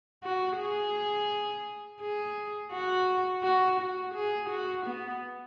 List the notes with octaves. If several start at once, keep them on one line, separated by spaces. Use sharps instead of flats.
F#4
G#4
G#4
F#4
F#4
F#4
G#4
F#4
B3